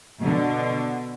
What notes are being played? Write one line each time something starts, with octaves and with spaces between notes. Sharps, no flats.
B2 D3